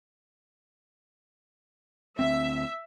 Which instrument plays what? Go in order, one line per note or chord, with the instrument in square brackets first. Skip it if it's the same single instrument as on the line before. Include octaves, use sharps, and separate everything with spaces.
[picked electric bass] D2 A#3 C4 [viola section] E5